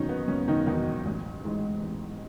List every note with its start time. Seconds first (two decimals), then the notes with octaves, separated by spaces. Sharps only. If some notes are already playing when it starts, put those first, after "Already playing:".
Already playing: F#1 E2 B2 D#3 C#4 D#4
0.09 B3
0.28 F#1 C#4
0.48 D#3 D#4
0.67 E2 B2 D#3 D#4
1.05 A1
1.44 G#2 E3 G#3
1.83 A1